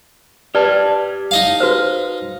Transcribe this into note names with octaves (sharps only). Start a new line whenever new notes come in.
G4 B4 D5 A5
D#4 D#5 F5
F#4 B4 C5